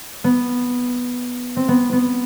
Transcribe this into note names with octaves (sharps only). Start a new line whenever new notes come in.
B3
C4
B3
B3